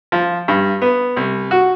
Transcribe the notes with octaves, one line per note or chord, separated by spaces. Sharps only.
F3
G2
B3
C2
F#4